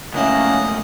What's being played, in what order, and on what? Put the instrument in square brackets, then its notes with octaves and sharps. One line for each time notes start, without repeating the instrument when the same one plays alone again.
[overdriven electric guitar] C#2 A2 [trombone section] A#3 C#4 [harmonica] D#5 F#5 [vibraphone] E5 G#5